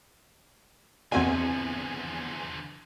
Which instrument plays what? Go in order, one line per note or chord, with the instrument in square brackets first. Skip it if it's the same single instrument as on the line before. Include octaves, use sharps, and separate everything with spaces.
[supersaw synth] E2 G#5 [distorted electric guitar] D3 F3 [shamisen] C4 F#4 D#5